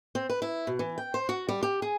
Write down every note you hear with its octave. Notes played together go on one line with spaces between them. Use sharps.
C4
B4
E4
B2
E3
G5
C5
F#4
G3
G4
G#4